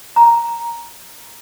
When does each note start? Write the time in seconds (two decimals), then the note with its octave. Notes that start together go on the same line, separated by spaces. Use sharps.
0.16 A#5